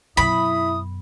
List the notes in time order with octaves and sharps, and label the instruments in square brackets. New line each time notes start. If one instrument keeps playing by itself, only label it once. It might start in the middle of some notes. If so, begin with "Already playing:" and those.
[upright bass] F#2 B2 [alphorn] E4 [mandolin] B5 [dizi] D#6